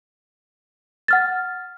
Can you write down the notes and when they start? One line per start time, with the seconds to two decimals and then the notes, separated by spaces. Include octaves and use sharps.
1.08 F#5 F6 A6